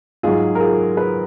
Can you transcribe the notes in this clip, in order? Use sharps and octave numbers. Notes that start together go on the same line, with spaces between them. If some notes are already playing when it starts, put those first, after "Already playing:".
G#2 F#3 F4 G#4
A#4
F4 G#4
G#4 B4